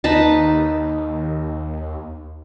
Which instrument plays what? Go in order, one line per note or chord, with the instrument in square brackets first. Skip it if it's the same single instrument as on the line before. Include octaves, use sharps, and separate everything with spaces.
[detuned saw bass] D#2 [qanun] D#4 B4 A5